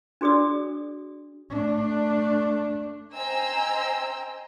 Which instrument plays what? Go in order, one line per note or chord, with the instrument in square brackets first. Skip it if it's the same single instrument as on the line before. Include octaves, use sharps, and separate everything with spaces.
[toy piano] D4 F#4 G#4 D5 D#6
[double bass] A3 D4
[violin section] C5 D#5 G5 G#5 A#5 E6